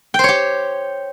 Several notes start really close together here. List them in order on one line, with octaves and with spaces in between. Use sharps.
G5 C5 C#5 G4